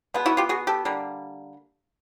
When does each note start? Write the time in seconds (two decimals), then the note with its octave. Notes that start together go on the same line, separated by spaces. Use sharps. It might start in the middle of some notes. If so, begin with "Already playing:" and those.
0.14 B2 G#3 B3
0.26 E4 F#4
0.37 F4 G4
0.49 F#4 G#4
0.67 G4 A4
0.85 D3 G3 A#3